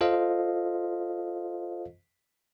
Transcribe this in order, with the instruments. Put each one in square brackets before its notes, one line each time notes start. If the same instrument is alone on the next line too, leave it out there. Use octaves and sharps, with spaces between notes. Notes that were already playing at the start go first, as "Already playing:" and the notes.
[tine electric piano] F4 A4 C5 D#5 F5